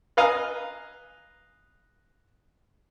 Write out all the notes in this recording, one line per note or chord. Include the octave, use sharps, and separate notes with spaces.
B4 D#5 F5 G#5 A#5